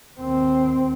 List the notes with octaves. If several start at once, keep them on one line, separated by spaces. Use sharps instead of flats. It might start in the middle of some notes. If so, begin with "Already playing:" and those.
D#2 C4